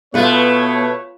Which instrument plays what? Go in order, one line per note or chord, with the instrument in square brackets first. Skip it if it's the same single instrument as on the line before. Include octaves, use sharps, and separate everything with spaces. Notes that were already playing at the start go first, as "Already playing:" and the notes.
[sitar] B2 A3 [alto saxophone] B3 [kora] F4 B4 F#5 [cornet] C#5